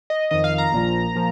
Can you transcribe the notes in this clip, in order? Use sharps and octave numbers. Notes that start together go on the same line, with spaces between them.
D#5
F2 D#3 D#5
F5
A#5
A#1 A#2 F3
A#2 F3